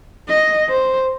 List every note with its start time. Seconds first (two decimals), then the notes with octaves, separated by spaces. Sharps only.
0.29 D#5
0.70 C5